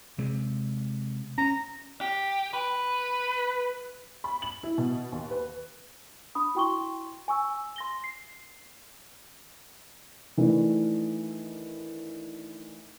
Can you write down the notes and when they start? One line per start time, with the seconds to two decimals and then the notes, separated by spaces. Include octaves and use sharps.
0.18 C3 G#3
1.38 C#4 A#5
2.01 G4
2.53 B4
4.24 B5
4.42 F#7
4.63 E4
4.78 B2
5.12 D#2
5.31 B4
6.35 D4 B5 D#6
6.55 E4 F#4 G5 C6 C#6 G7
7.28 G#5 C#6 E6
7.76 C6 A#6 G7
8.04 C7
10.37 D#3 E3 A3 D4